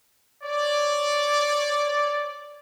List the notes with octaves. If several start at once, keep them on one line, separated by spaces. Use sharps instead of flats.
C#5 D5